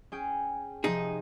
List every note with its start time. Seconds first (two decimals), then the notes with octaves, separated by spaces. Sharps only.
0.12 C#4 G#4 G5
0.84 C3 F3 D#4 G#4